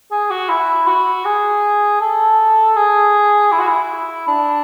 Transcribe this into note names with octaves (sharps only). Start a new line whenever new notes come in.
G#4
F#4
E4
F#4
G#4
A4
G#4
E4
F#4
E4
D4